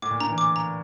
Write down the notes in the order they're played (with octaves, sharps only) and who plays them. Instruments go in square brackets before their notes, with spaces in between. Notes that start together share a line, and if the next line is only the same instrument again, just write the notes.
[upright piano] A2 [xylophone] D6
[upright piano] A#2
[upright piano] D3 [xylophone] A#5
[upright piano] E3
[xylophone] D6
A#5